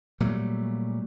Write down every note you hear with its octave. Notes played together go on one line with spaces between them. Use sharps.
A#2 F#3 G3 A3